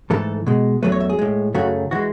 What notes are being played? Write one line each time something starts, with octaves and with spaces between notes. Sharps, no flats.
G#2 E3 A3 A4
B2 G#3
E2 B2 F#3 A3 B4
C#5
E5
G#4
A2 G#3
F#2 C#3 F#3 A3 F#4
E3 G#3 F#4